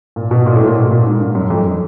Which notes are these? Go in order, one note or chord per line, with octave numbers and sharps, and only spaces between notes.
A#2
B2
A#2
A2
A#2
B2
A#2
G#2
G2
F#2
F2